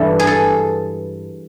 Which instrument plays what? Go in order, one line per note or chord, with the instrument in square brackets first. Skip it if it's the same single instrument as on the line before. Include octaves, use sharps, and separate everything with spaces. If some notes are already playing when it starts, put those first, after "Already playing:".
Already playing: [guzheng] G2 E3 A4
G#4
A4